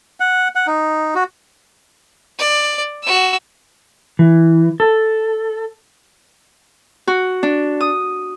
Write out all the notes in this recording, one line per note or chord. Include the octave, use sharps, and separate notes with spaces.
F#5
F#5
D#4
F#4
D5
F#4 E6
E3
A4
F#4
D4
D#6